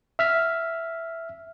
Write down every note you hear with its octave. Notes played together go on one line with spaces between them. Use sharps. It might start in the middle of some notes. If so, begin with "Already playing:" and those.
E5 F6 B6